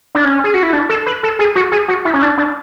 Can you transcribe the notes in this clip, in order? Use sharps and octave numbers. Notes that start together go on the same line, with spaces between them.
D4
C#4
G#4
F#4
E4
D4
A4
B4
A4
G#4
F#4
G#4
F#4
E4
C#4
D4
D4